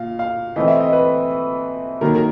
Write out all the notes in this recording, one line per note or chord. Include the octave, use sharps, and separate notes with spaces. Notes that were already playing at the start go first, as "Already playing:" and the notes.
Already playing: A#2 F5
F5
E3 A3 C4 D#5
E5
D#5
B4
D#3 F#3 A#3 A#4
A#4